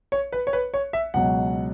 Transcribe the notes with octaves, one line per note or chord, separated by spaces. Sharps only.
C#5
B4
C#5
B4
C#5
E5
C#2 B2 F#3 F#5